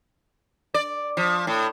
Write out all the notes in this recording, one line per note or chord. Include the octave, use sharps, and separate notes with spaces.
D5
F3
A2